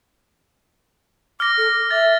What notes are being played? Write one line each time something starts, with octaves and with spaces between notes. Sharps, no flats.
D6 F6 A#6
A4
D6
E5 A6